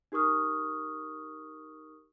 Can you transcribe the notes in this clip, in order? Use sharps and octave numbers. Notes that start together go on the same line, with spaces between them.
D#4 G4 A#4 C#6 D#6 F6